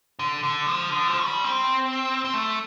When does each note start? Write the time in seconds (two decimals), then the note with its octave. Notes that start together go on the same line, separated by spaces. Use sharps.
0.19 D3
0.43 D3
0.67 F3
0.90 D3
1.08 F3
1.19 A3
1.26 G3
1.44 C4
2.25 C4
2.34 A3